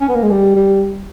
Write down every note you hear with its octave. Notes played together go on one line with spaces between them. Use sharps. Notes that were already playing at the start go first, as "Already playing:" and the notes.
C#4
B3
A#3
G#3
G3
G3